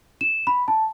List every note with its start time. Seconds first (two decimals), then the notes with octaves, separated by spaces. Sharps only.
0.21 E7
0.47 B5
0.68 A5